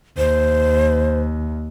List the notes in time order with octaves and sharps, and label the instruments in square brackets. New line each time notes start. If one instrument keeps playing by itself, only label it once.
[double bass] D#2 [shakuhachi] C5